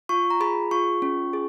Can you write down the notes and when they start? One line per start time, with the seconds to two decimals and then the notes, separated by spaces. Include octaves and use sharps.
0.09 F4 C#6
0.30 A#5
0.41 G#4 B5
0.71 F4 C#6
1.02 C#4
1.33 G#4